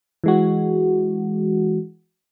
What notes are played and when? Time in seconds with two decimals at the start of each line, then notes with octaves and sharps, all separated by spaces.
0.24 E3 G#3 F#4